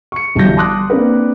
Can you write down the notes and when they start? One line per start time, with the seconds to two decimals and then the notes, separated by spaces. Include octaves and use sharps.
0.12 C#6 C#7
0.35 G1 G2 E3 F#3 G6 A#6
0.57 A5 C6 D6 D#6 F#6
0.90 A#3 C4 D4 A#4 B4